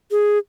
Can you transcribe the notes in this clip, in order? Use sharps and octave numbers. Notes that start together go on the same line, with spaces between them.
G#4